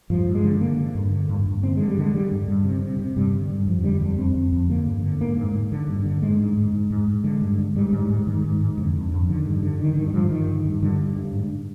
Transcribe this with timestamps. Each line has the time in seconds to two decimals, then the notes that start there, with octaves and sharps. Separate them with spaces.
0.10 G2 F3
0.26 G2
0.35 G#3
0.44 D3
0.60 D3 A#3
0.78 D3
0.95 G2
1.12 D3
1.29 G2
1.46 G2
1.63 D3 C4
1.76 D3 G#3
1.88 G3
1.98 D3 G#3
2.14 D3 G3
2.32 G2
2.48 G2
2.65 C3
2.82 C3
2.99 C3
3.17 G2 G3
3.33 D3
3.50 G2
3.67 F2 F3
3.84 D3 G3
4.01 F2 G3
4.18 F2 C4
4.35 F2
4.52 F2
4.70 D3 A#3
4.86 G2
5.03 D3
5.21 G#2 A#3
5.37 G#2
5.55 G#2
5.72 D3
5.88 G2
6.06 D3
6.22 G#2 G#3
6.40 G#2
6.57 G#2
6.73 G#2
6.90 G#2
7.08 G#2
7.24 D3 G#3
7.42 G2
7.59 D3
7.76 G#2 G3
7.93 G#2
8.10 G#2
8.27 G#2 D#3
8.44 G#2
8.61 G#2
8.78 F2 D3
8.95 F2
9.12 F2
9.29 D3 D#3
9.46 G2
9.63 D3
9.80 D3 D#3
9.97 G2 D#3
10.08 D#3
10.14 G2 F3
10.31 G2 D#3
10.48 D3
10.65 G2
10.82 G2 D3
10.99 G2
11.17 G2
11.33 G#2